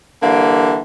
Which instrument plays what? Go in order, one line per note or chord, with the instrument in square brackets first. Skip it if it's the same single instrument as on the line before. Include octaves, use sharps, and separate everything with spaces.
[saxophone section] D3 E3 G3 A#3